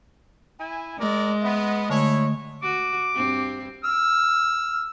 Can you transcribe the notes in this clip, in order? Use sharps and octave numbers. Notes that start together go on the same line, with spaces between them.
E4 G#5
G#3 A#4 D5
B3 E5
D3 A3 E4 C#5 G#5
F#4 D6
G2 C4
E6 F6